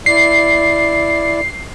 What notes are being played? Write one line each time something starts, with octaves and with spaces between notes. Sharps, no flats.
E4 D5 C7